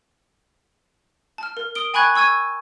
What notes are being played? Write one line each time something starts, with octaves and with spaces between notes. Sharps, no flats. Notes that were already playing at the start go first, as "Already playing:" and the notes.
A5 F6
A#4
D#6 D7 G7
G5 G#5 B5 C#6 F#6 G#6
C#6 E6 G#6 D#7